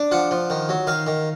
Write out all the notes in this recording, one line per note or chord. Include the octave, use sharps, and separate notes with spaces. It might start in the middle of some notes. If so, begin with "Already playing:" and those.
Already playing: D4
F3 F#5
F3
D#3
F#3
D#3 F5
D#3